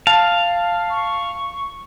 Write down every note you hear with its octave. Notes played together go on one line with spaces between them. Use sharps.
F5 A5
C#6